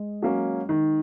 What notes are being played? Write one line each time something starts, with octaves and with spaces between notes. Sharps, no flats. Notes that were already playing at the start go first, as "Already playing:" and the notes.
Already playing: G#3
F#3 A#3 C#4
D#3